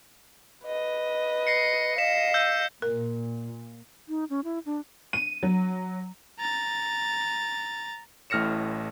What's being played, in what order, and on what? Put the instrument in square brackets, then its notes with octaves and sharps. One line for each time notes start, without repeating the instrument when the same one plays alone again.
[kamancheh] B4 D#5
[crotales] A#6 C7 C#7
[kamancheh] D#5 F5 [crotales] B6 E7
[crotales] E6 G6
[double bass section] A#2 [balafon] A#4
[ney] D#4
C#4
E4
D4
[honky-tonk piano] D#7
F#3
[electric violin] A#5 A6
[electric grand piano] A1 A2 F6 A#6 C#7 E7